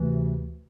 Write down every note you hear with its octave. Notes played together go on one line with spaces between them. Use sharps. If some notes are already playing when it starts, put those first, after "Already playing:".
Already playing: D2 C3 E3